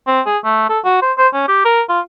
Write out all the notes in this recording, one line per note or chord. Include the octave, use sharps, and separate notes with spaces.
C4
G#4
A3
A4
F#4
C5
C5
C#4
G4
A#4
F4